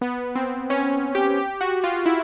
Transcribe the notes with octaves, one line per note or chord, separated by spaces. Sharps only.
B3
C4
C#4
G4
G4
F#4
F4
E4